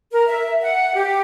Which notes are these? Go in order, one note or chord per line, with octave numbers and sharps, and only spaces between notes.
A#4
E5
F#5
G4